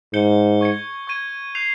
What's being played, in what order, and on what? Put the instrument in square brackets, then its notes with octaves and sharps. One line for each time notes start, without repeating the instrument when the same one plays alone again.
[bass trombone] G#2 [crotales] G6 C#7 G7
[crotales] C#6 G#6 C#7
C#6 G#6 D#7
G6 C7 F7